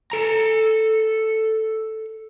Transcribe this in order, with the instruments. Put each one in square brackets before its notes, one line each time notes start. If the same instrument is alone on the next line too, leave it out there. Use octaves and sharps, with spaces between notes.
[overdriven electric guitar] A4 A#5